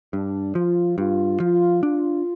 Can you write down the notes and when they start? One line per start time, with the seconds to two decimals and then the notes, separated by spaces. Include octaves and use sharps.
0.13 G2 D4
0.55 F3 F4
0.98 G2 F4
1.40 F3 F4
1.83 D4 F4